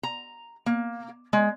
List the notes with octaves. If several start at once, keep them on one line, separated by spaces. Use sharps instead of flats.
A#5
A#3
G#3